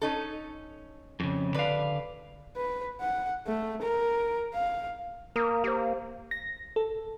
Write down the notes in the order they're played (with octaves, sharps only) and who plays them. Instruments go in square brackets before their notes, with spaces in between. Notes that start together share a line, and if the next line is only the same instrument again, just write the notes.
[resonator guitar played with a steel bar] C#4 D#4 A4
[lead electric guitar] F2 C#3
[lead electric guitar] D3 F5 [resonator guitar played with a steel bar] B4 D5
[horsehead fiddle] B4
F#5
A3
A#4
F5
[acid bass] A#3 [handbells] A#4 A#5 D#6
[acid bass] A#3 [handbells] G4 C5
[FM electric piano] A#6
A4